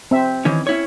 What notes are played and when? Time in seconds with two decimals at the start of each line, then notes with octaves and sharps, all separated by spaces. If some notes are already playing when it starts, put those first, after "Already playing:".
0.11 C4 E5
0.45 D#3 E3 C#4
0.67 C#4 E4 C#5